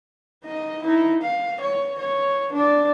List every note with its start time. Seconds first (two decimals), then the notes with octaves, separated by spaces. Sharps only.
0.45 D#4 D#5
0.83 D#4 E4
1.22 F5
1.61 C#5
1.99 C#5
2.53 D4 D5